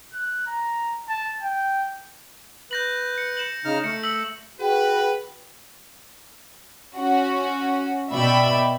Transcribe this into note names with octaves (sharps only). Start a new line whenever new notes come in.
F#6
A#5
A5
G5
B4 G6 A#6 F#7
C#7
C#7 E7 F#7
C#3 D#4 F6
A3 C#7
E6 B6 F#7
F#4 G#4 B4 G5
C#4 F#4
B2 D5 E5 G5 B5